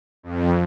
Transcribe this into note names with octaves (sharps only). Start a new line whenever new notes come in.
F2